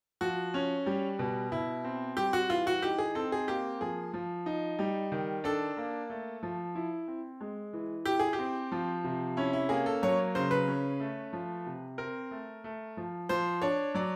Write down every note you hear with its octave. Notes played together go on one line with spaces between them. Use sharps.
F3 F#4
C#4
G3
B2
B2 E4
C4
G3 G4
F#4
E3 F4
F#4
D#4 G4
G#4
C4 A4
G#4
A#3 G4
F3 G#4
F3
D#4
G3
D#3
D4 A4
A#3
A3
F3
E4
C4
G#3
E3
E4 G4
G#4
G4
C4
F3
C3
C#4 E4
E4
A#3 G#4
A4
F#3 C#5
C#3 C5
B4
C#4
A3
F3
C3
C4 A#4
A3
A3
F3
F3 C5
D4 C#5
F#3 D5